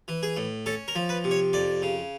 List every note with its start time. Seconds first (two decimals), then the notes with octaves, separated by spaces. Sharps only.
0.08 E3
0.23 G#4
0.37 A2
0.66 C#4 A4
0.88 A#4
0.95 F3
1.09 B4
1.24 C3
1.31 C#5
1.53 F2 D5
1.82 C#3